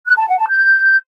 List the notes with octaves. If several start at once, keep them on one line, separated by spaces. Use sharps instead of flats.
F#6
A5
F#5
A5
G6